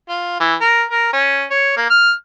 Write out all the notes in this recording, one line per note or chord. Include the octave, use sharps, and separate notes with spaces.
F4
E3
A#4
A#4
C#4
C#5
A#3
F6